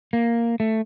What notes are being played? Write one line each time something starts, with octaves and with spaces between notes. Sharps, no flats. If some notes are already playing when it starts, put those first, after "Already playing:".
A#3
A3